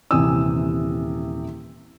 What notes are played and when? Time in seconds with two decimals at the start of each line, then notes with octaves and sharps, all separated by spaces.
0.11 D#1 C3 E3 G#5 D#6 E6